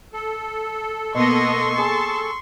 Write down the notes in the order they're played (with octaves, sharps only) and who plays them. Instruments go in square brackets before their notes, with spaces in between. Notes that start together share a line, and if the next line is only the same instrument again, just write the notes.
[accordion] A4
[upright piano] B2 [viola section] A#3 B3 D#5 [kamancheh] C6 C#6
[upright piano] G#4 [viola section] A5